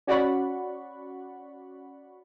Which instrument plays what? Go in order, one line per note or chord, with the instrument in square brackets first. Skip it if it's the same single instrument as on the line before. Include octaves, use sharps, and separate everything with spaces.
[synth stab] C#4 F#4 D5 F#5 B5 C#6